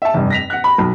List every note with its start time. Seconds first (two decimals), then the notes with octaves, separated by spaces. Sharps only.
0.02 E5 A5
0.14 F1 G2
0.30 A#6 B6 F7
0.50 F#5 F#6
0.64 B5
0.78 B1